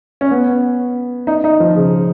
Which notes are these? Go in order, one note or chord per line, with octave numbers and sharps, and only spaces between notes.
C#4
B3
D#4
D#4
F3
C#3